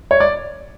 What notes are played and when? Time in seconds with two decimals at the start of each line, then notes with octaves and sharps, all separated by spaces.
0.11 C#5
0.20 D5